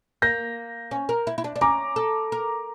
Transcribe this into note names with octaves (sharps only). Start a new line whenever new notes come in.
A#3 G6 A#6
C#4
A#4
E4
E4
D4
D4
C#4 A#5 D6
A4
A#4